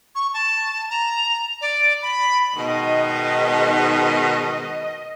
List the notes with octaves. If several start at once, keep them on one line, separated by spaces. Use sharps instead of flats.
C#6
A5
A#5
D5
B5
G#2 B2 D#3 D#5